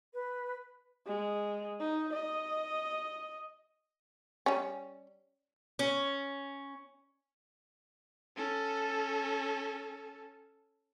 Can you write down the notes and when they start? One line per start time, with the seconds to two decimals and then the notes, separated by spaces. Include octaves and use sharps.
0.13 B4
1.06 G#3
1.80 D#4
2.14 D#5
4.46 G3 C#4
5.79 C#4
8.36 C#4 A4